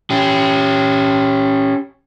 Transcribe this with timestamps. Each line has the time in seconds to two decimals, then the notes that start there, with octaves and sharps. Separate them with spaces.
0.10 C#4 G4